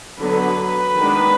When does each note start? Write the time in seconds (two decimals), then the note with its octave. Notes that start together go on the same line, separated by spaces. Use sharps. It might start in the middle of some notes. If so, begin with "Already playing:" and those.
0.21 D3 F#3 B3 B4
0.96 D#3 G#3 B3 D4